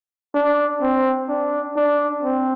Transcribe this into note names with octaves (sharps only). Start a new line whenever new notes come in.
D4
C4
D4
D4
C4